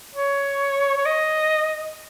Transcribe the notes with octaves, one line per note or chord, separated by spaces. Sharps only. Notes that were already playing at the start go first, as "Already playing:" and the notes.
C#5
C#5
D#5